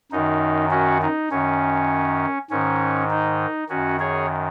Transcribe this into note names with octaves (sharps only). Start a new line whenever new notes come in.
F#2 D#3 D#4
C#4 F#4
D#4
F#2 D#3 C#4
G#2 D#3 C#4
D#4
F#2 D#3 C#4 F#4
G#4 C#5